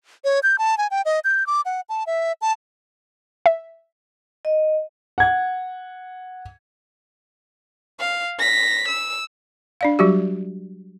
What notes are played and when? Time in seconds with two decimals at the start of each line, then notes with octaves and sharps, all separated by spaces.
0.24 C#5
0.43 G6
0.58 A5
0.78 G#5
0.91 G5
1.05 D#5
1.24 G6
1.47 D6
1.65 F#5
1.89 A5
2.07 E5
2.41 A5
3.46 E5
4.45 D#5
5.18 F#5 G#6
8.00 F5
8.39 A#6 B6
8.88 E6
9.81 D4 D5 F5
9.99 F#3 G3 F#4 G4